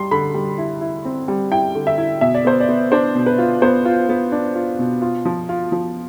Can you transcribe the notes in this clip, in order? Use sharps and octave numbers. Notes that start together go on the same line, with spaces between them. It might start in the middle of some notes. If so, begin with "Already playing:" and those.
Already playing: G3 C6
D3 B5
G3
E4
E4
C4
G3
E4 G5
D3
E5
E4
B2 E5
D5
B3 C5
D5
B3
D4 C5
B2
B4
F4
B3 C5
F4
B3
D4
F4
B2
F4
F3
F4
F3